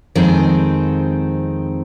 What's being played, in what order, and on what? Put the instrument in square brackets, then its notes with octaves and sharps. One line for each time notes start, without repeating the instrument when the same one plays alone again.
[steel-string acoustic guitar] F2 D#3 G#3 C4 G#4